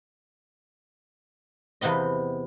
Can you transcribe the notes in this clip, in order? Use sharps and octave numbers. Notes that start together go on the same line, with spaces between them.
E2 C3 B3 C4 D#5